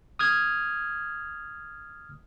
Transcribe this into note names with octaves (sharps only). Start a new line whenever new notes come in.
D#6 F6 G#6